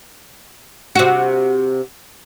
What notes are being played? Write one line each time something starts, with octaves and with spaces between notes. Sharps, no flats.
C3 F#4